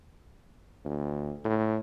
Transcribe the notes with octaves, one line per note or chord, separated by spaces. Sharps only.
D2
A2